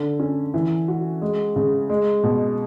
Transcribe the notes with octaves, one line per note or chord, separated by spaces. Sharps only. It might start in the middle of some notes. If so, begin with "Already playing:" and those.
Already playing: D3
C#4
E3
F#4
G#3
C#3
G#3
B2